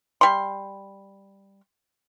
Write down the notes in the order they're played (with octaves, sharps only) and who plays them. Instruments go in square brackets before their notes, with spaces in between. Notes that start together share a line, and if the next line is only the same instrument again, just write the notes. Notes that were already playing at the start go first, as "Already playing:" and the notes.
[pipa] G3 C6